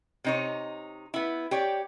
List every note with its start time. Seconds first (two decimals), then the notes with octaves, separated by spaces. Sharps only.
0.24 C3 D#4 C#5
1.14 B3 E4
1.51 G4 C#5 D5